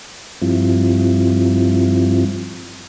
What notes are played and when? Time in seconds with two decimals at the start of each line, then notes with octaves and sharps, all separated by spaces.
0.42 G2 F3 G3 C4 E4 F4